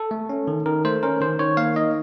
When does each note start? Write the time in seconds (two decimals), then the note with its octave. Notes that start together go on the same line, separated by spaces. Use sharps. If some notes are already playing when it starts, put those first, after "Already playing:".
Already playing: A4
0.11 A3
0.29 C#4
0.47 D#3
0.66 D#3 A#4
0.84 A3 C5
1.03 C#4 A#4
1.21 D#3 C5
1.39 D#3 C#5
1.57 A#3 F5
1.76 D#4 D#5